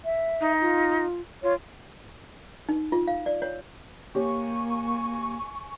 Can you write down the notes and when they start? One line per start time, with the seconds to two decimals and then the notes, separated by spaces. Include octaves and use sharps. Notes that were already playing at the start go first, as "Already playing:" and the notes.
0.05 E5
0.40 D#4
0.61 F4
1.43 F4 C#5
2.69 D#4
2.92 F4
3.08 F5
3.26 D5
3.42 C#5
4.15 A#3 G4 C#5 G#5 C#6